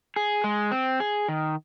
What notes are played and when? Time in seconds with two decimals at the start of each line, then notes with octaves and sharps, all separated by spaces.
0.16 G#4
0.44 G#3
0.72 C4
1.00 G#4
1.28 D#3